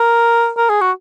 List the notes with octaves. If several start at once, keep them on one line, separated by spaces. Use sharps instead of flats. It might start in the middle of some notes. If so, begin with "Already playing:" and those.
Already playing: A#4
A#4
G#4
F#4